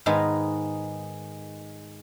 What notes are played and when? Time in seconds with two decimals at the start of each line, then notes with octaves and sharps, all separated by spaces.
0.06 G#2 D#3 G#3 B3 D#4